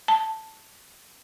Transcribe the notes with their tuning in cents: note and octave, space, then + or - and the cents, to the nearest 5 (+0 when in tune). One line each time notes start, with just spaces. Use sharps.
A5 +0